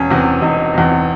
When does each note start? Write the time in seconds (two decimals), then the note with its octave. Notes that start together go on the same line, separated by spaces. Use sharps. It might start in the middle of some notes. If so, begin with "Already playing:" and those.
Already playing: E1 C#4
0.10 E2 C3
0.42 E1 D#4
0.74 E2 C3